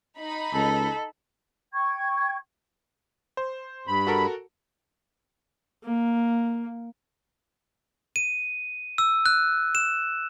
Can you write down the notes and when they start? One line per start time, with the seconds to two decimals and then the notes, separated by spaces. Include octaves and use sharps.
0.19 D#4 B5
0.53 C#2 A4
1.73 G5 C#6 G#6
3.37 C5
3.87 G2 B5
4.07 F#4 A4 A#4
5.84 A#3
8.16 D#7
8.98 E6
9.26 F#6
9.75 E7